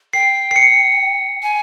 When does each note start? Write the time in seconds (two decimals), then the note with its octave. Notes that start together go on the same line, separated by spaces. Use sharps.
0.13 G5 C7
0.51 C7
0.56 C#7
1.43 G#5